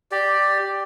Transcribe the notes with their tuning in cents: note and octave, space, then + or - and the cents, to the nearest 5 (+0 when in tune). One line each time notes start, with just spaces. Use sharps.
G4 +0 D5 +5